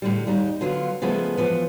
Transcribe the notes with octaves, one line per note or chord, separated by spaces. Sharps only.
A2 D3 G3
D#2 G3 D#4
D3 F#3 B3 F4
C#3 F3 G#3 A3 B3
E3 F3 B3